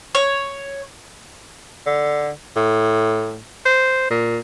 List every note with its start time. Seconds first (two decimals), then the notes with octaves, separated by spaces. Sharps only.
0.15 C#5
1.86 D3
2.56 A2
3.66 C5
4.10 A#2